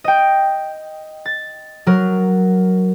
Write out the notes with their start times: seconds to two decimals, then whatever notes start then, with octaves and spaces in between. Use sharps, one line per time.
0.04 D#5 G5
1.26 A6
1.86 F#3 A#4